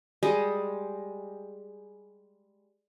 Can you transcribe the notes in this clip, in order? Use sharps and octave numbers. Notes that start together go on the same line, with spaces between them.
G3 G#3 G4 D#5